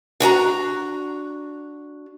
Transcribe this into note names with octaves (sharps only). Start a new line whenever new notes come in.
D4 F#4 G#5 A#5